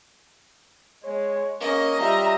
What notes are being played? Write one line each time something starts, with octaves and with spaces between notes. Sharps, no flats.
G#3 C#5
A#3 C#4 D#5
G3 F4 E5 A#5